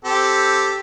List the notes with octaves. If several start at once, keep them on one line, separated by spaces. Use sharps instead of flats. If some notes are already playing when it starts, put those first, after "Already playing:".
C4 G4 A4